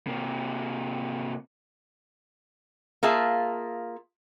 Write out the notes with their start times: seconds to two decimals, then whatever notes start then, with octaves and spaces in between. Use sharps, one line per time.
0.07 C3 A#3
3.03 A#3 F4 G#4 E5 A5